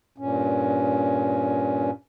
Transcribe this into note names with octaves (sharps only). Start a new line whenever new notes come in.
G2 A#2 C#4